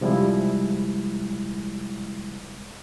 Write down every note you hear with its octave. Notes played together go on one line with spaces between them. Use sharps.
C3 F3 G3 G#3 E4